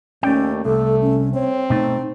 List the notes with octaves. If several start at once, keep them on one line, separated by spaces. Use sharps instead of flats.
D#2 A3 C#4 D5 G5
C2 A3 A4
C#4
C4 C#5
B2 A3 D#4